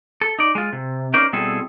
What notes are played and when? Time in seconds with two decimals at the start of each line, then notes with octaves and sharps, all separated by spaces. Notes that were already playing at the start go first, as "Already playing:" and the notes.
0.21 A4
0.39 D#4 D5
0.55 G#3 F4
0.73 C3
1.14 C#4 D#4 A#4 C5 D5
1.33 B2 G3 C4 E4 G#4 A4